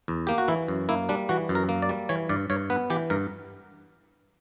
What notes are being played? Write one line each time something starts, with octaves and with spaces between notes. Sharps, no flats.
E2
A#3 G4
F#4
E3 E4
F#2
A#3 E4
G3 D4
E3 F#4
F#2
A#4
A#3
D5
G3
E3 C#5
G2 D5
G2 C#5
B3 B4
E3 G4
G2 A#4